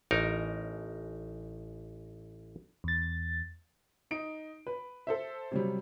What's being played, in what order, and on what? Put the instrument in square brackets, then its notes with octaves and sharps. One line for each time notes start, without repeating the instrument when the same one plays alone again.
[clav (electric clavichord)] A1 D#4 A#4
[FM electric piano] E2 A6
[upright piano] D#4 D7
B4
A4 C5 E5
C3 F#3 G3